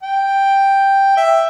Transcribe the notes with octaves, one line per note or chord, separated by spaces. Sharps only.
G5
E5